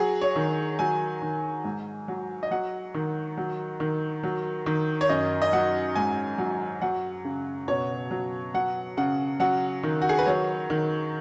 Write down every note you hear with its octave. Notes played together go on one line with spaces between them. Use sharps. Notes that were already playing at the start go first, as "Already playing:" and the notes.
Already playing: F#3 G#4
C#5
D#3
F#3 G#5
D#3
G#2
F#3
D#5
F#3 F#5
D#3
F#3
D#3
F#3
D#3
C#5
F#2 D#5
D#5
F#3 F#5
G#2 G#5
F#3
F#3 F#5
C#3
B2 C#5
F#3
F#3 F#5
C#3 F#5
F#3 F#5
D#3
F#4
G#4
B4
F#3 C#5
D#3